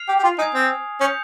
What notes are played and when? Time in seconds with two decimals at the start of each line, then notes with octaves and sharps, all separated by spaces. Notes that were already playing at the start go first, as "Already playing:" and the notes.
Already playing: F6 C7 F7
0.08 G4
0.19 G4
0.24 F4
0.38 D#4 G#5 D#6 G#6
0.54 C4
1.00 C#4 D#6 G6 C#7 F7